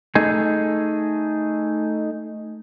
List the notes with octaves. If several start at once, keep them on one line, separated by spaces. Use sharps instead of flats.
A3 D#4 G#4